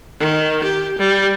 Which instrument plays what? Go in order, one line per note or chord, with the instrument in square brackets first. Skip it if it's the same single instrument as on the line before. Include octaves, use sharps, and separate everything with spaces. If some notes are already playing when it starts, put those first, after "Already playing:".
[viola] D#3
G4
G3